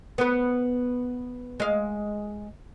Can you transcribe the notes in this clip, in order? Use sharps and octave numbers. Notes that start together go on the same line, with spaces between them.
B3 B4
G#3 F5